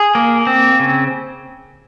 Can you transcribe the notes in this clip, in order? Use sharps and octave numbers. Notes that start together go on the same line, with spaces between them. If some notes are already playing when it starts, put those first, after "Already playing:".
Already playing: G#4
A#3
C4
C#3